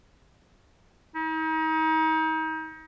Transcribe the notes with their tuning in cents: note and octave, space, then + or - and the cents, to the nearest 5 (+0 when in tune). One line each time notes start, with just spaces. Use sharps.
D#4 +35